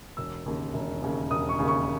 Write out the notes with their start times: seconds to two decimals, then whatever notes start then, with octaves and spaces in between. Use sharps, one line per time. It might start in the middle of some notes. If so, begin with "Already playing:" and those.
0.17 E1 E6
0.46 D#2 C#3
0.74 E1
1.02 D#2 C#3
1.30 E1 D#6
1.49 C#6
1.59 D#2 C#3
1.68 C#6